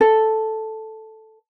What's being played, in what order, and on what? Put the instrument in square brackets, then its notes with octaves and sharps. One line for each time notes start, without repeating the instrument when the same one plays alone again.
[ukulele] A4